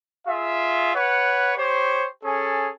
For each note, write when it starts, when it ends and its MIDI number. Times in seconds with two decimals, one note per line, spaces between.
0.27 0.94 65
0.27 0.94 68
0.27 0.94 76
0.95 1.51 71
0.95 1.51 73
0.95 1.51 78
1.56 2.06 67
1.56 2.06 72
1.56 2.06 73
2.24 2.71 61
2.24 2.71 68
2.24 2.71 69